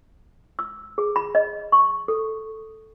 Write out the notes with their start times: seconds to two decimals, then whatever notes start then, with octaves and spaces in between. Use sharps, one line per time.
0.59 E6
0.98 G#4
1.16 B5
1.35 D#5
1.72 C#6
2.08 A4